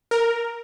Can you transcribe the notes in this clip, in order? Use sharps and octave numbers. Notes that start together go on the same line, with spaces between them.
A#4